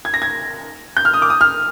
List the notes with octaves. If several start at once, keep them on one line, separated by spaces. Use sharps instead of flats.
G#6
A#6
G#6
G6
F6
D#6
D6
D#6
F6